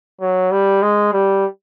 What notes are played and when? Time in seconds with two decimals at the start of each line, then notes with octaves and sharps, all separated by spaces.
0.21 F#3
0.51 G3
0.82 G#3
1.13 G3